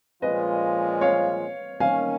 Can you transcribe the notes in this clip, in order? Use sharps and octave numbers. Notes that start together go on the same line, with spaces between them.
A#2 F3 G#3 C#4 F4 B4 D#5
C#5 F5
D#3 A#3 C#4 F5 G#5